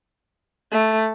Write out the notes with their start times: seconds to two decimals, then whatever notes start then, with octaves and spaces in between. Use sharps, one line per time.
0.72 A3